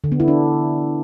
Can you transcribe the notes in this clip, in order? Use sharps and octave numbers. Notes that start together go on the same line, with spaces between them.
D3
B3
E4
D4